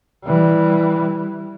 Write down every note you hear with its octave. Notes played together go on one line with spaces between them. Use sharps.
E3 G3